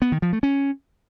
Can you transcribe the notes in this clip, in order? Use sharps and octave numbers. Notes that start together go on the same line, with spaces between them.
B3
D#3
F3
A3
C#4